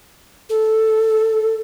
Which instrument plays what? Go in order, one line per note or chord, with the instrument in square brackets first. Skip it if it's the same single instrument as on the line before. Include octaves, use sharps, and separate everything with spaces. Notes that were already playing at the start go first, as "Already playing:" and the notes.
[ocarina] A4